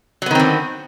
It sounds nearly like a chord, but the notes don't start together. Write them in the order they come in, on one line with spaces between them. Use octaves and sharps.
F#3 B3 D#3 C4 D3